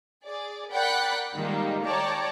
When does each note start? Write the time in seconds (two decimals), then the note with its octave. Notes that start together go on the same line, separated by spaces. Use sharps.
0.24 G#4 D5
0.71 A#4 D5 F#5 G5 B5 F#6
1.36 D#3 G3 G#3 A#3 D#4 F4
1.84 C#5 D5 G5 A5 A#5